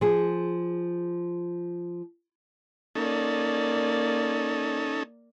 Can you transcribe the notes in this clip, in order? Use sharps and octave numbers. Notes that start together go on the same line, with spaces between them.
F3 G#4
A#3 C#4 D#4 A4 D5